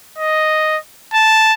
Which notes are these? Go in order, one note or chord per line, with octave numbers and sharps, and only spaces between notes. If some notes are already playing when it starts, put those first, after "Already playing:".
D#5
A5